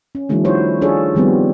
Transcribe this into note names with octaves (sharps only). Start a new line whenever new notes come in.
C#4
D#3 F3 G3 A3 D4
E4 F#4 C5 C#5
D4 F4 G#4 A4 C#5
D#3 F3 G3 B3 C4